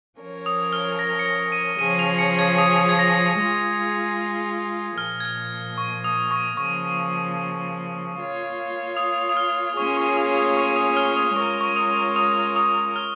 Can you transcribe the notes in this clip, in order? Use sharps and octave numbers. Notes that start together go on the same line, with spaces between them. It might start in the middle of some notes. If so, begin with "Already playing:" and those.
F3 C#4 A#4 C#5
D#6
F6
A#6
C#7
A#6
D#7
C#3 F3 C#4 G#4 C#5 D#7
F7
C#7
G#6
D#6
G#6
A#6
G#3 F4 G#4 A#6
A#2 F3 A#3 F6
G#6
F6
C#6
D#6
C#6
C#3 F3 A#3 C#6
A#3 F4 C#5
D#6
D#6
F6
A#3 C#4 F4 G#4 C#5 C#6
C#6
D#6
D#6
C#6
D#6
F6
D#6
G#3 C#4 F4 A#4 C#5 C#6
C#6
D#6
D#6
D#6
F6